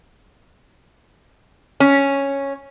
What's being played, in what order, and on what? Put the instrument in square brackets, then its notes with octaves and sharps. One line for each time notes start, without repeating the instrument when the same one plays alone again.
[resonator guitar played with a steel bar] C#4